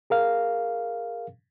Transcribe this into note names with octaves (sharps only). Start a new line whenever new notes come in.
G#4 A#4 F5